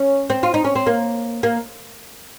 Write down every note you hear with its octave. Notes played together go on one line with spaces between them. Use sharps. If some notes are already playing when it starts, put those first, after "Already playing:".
Already playing: C#4
C4
F4
D#4
C#4
C4
A#3
A#3